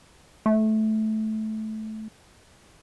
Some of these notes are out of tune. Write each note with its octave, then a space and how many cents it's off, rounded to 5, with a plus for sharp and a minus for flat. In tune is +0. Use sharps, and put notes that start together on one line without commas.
A3 -15